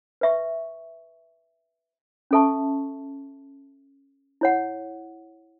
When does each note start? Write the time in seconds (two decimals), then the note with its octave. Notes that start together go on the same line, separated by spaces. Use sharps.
0.21 B4 E5 C#6
2.31 C#4 A4 E5 A5 C#6
4.41 E4 C#5 F#5